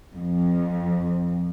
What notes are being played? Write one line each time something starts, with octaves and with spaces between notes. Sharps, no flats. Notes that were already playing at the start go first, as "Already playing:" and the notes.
F2